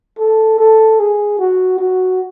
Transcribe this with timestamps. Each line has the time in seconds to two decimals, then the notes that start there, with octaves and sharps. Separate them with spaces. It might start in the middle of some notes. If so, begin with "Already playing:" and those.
0.19 A4
0.59 A4
1.00 G#4
1.39 F#4
1.79 F#4